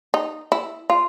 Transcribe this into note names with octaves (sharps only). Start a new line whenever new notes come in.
D#4
E4
F4